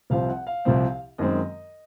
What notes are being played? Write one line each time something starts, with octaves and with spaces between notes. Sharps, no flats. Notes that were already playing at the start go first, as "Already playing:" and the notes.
C2 C3 F3 C4 F5
F#5
F5
C2 C3 F3 C4
F#2 D#3 G#3 C4 D#5